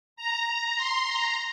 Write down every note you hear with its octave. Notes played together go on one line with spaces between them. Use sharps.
A#5
A#5
C6
A#5